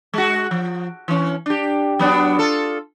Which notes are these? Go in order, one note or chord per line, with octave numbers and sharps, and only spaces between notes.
G#3 F#4
F3
E3 C#4
D4 G4
F#3 B3 D4
F4 A4